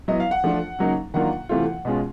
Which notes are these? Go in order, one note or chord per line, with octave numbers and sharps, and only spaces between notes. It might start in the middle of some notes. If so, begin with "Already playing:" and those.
F#3 B3 E4 D#5
F5
F#5
F3 A3 D4 F4
C#3 F#3 A#3 D#4
D#3 F#3 A#3 D4 F4 F#5
C3 E3 A3 C4 F4
B2 G#3 C#4 F4